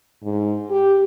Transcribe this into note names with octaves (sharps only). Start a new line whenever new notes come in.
G#2
G4